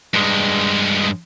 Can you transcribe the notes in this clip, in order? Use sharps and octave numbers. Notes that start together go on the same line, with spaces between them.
G2 G#3